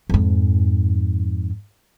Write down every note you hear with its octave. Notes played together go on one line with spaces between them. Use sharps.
F2 G#2